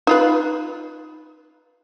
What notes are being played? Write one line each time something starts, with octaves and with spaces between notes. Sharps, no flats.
D#4 F4 B4